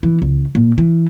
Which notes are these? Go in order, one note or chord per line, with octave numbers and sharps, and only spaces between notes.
E3
C#2
A#2
E3